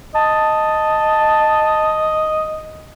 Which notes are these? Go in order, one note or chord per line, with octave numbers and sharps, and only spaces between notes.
D#5 A5